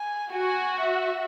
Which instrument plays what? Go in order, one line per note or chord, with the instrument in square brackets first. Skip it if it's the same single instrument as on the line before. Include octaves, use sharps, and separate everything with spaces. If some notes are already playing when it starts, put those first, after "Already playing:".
Already playing: [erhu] G#5
[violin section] F#4 [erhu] G#5
[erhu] E5